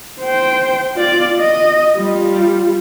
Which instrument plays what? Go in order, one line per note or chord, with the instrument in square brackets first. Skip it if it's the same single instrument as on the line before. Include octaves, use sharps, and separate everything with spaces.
[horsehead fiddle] C5 G5
F4 D5
D#5
G3 F4